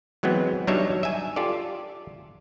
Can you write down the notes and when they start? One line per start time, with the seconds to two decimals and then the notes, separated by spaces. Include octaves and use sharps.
0.23 E3 F#3 G#3 B3 C4
0.67 F#3 G3 D4 D#4 C#5 E5
1.03 E5 G#5
1.36 F4 G4 A4 D5